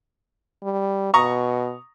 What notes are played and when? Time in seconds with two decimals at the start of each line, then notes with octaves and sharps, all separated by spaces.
0.63 G3
1.14 B2 A#5 C#6 D#6